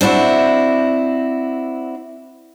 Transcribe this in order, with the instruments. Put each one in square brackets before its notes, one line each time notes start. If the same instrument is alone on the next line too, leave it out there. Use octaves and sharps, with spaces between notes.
[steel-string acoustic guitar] C4 D4 E4 F#4